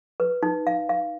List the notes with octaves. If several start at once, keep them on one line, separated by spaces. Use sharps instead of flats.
B4
D#4
F5
F5